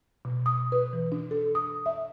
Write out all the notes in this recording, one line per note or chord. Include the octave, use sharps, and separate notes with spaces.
B2
D#6
B4
E3
D4
A4
D#6
E5